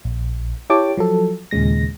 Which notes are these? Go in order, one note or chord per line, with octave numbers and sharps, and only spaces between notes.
A#1
E4 G4 C#5 G5 A5 D6
F3 F#3 A4
D#2 A#2 C#3 G#3 A#6